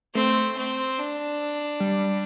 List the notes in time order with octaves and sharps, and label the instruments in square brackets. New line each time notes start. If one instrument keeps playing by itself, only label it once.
[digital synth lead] A3 [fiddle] C4
[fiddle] C4
D4
[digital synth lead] G3